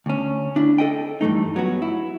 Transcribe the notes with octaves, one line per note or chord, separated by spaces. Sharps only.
D2 C#4
D4 E4
A4 D#5 G5
G2 E3 A3 D#4
F#3 B3 F#4
E4